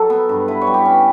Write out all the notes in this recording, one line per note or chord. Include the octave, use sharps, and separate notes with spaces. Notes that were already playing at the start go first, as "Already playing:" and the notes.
Already playing: F#3 A4
B3
G2
E4 B4
C#5
G3
G4
C#4